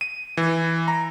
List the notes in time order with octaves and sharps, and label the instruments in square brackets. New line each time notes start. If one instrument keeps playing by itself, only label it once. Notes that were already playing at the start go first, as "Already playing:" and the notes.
[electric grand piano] D#7
E3
A#5